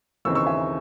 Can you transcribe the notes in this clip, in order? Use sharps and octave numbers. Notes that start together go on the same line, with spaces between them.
D#2 C#3 E3 C4 D#4 C#6 E6
C#6 E6
E5 G#5